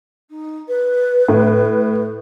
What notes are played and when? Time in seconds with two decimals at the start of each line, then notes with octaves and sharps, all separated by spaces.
0.30 D#4
0.68 B4
1.28 A2